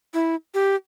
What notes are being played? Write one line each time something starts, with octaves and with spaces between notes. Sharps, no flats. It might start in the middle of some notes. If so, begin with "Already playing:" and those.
E4
G4